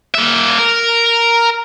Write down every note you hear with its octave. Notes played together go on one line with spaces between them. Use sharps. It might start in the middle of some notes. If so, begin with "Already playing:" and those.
A#3 E5
A#4